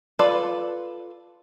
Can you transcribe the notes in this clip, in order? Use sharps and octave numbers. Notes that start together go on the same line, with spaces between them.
F4 A4 B4 D5